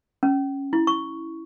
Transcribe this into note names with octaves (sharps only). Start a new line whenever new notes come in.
C#4
E4
C#6